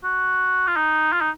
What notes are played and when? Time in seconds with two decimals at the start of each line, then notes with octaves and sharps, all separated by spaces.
0.03 F#4
0.67 F4
0.76 D#4
1.13 F4
1.21 D#4